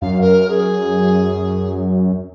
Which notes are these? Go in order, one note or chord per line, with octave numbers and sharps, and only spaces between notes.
F#2 F5
A#4
G#4